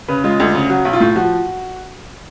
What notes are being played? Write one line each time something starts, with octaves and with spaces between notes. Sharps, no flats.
C#3 B4
G#3 F4
D2
C#3
F#3 F#4
B1
F4
A2
F3 F#4